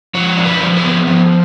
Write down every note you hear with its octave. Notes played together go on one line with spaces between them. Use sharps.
F3 C#5
D4
B4
F3
B4
B3
F3